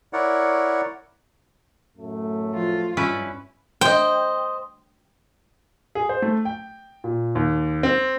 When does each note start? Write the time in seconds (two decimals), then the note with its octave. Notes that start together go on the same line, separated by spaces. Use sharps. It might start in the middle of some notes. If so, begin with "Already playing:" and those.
0.13 E4 A#4 C#5 D5 F#5
1.98 F#2 A2 A3
2.51 F3 F4
2.97 G2 C#4 E4 B4
3.81 C5 D#5 G5
5.95 G#4
6.09 C5
6.22 A3
6.45 G5
7.04 A#2
7.35 D#2
7.83 C4